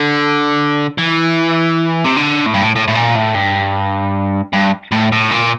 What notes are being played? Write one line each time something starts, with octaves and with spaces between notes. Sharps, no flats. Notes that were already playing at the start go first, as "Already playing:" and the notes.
Already playing: D3
E3
C3
D3
A2
G2
A2
A2
A2
A#2
A2
G2
G2
A2
A2
A#2